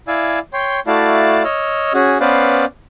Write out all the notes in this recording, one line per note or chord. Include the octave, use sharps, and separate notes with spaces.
E4 D5 F5 G#5 E6
C#5 G5 C6
A3 E4 F#4 D5 F5 A5
C#5 D#5 E6 F6
C#4 F#4 G#4
B3 C#4 B4 C5 D5 F5